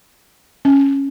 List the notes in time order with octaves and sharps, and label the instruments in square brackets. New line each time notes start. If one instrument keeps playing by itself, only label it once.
[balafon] C#4